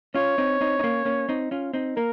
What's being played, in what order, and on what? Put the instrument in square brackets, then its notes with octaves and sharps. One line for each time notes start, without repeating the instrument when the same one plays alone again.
[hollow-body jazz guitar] C#4 F4 [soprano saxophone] C#5
[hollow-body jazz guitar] C4 D#4
C4 D#4
D#4
A#3 C#4
A#3 C#4
C4 D#4
C#4 F4
C4 D#4
[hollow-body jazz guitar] A#3 [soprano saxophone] A#4